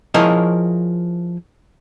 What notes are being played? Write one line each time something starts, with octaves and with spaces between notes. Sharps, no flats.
F3 E4 G#4 A#4 C#5 D#5